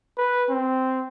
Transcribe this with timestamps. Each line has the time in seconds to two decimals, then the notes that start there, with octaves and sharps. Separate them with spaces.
0.17 B4
0.49 C4